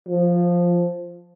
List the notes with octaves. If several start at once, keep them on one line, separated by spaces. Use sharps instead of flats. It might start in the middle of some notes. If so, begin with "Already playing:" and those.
F3